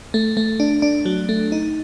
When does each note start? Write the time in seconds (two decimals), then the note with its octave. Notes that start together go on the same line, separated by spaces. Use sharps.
0.14 A3
0.37 A3
0.60 D4
0.82 D4
1.06 F#3
1.29 A3
1.52 D#4